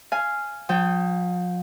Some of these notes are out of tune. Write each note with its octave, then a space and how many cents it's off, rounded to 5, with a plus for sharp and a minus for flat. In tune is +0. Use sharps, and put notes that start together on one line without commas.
F5 -10 G#5 +0
F3 +40 G5 -15